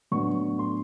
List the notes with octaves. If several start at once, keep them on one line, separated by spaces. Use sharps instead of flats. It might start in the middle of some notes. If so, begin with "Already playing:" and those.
A2 F#3 B3 D4 C#6
C6